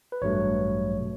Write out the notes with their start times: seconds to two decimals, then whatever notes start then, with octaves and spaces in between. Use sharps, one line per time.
0.12 B4
0.22 A1 G2 F#3 A3 C#5
0.99 B2 A3